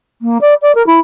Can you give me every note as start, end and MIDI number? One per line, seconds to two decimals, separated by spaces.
0.21 0.38 58
0.41 0.54 74
0.61 0.74 74
0.75 0.84 70
0.86 0.99 64